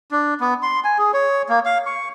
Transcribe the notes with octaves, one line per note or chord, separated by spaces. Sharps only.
D4
B3
C6
G#5
G#4
C#5
A#3
F5
C#6